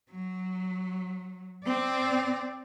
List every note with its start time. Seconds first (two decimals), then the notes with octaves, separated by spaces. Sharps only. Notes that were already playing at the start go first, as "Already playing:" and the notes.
0.11 F#3
1.65 C4 D5